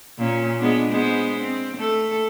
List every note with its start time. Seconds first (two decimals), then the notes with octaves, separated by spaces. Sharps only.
0.18 A#2 C#4
0.58 G#3 B3 D4
0.90 G#3 B3 C5
1.41 C4
1.76 A3 A4